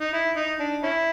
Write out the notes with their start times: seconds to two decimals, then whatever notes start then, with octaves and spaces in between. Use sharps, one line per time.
0.01 D#4
0.13 E4
0.36 D#4
0.59 D4
0.83 C#4 E4